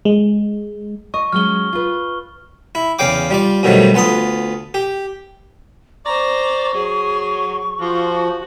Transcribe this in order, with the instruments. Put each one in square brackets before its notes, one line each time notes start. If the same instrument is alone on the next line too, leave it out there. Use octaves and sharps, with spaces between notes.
[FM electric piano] G#3
[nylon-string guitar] D#5 [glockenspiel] C#6
[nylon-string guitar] F#3 G#3 C#4 [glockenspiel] F6 G7
[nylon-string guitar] F4 B4
[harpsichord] E4
E2 C#3 F5 G5 D6
G3 F4 D5
G2 B2 D#3 F3 F#3 A3
D2 B3 F4 A5 D#6
G4
[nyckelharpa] C5 A#5 [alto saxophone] D5 [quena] C#6
[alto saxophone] F#3 [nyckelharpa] G#4
[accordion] F3 [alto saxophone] F4 [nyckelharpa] F#4